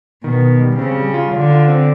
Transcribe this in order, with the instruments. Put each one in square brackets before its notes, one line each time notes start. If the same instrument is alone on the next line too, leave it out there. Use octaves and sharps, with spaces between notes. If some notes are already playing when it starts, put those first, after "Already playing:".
[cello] B2 [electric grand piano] D#3
[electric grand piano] D#3
G3
[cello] C#3 [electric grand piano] C4
[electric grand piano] G3
F4
[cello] D3 [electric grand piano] F4
[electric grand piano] F4
C4